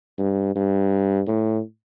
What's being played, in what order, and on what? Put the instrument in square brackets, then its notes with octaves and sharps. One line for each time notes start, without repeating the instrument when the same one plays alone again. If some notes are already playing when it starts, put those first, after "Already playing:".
[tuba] G2
G2
A2